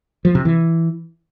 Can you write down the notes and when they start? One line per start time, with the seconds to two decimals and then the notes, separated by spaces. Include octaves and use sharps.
0.25 F3
0.35 C3
0.45 E3